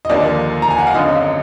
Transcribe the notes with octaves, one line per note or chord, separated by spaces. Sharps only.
D#5
D#2 D3 F3 A#3 D5
A#5
G#5
F#5
F5
G#1 F#2 D3 D#5